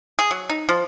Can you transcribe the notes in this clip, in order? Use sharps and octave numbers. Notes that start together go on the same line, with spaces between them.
G#4
F#3
D#4
F3